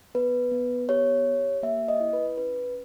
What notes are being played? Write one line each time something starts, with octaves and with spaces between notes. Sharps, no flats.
B3 B4
B3
G4 C#5
G4
A#3 E5
D#5
E4
B4
C#4 B4